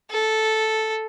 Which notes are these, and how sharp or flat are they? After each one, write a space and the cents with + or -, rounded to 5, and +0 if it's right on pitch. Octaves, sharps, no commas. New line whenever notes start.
A4 -5